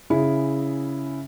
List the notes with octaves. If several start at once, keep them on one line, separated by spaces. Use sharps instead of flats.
C#3 E4 G#4